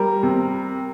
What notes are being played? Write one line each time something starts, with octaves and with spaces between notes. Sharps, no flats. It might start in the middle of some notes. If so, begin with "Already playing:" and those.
Already playing: G3 A#4
C3